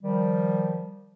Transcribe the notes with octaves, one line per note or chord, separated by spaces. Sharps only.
D#3 F3 G3